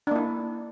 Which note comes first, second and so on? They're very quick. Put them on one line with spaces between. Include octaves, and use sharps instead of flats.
D4 A#3 E4